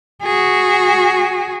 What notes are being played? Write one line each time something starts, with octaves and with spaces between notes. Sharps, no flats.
F#4 G#4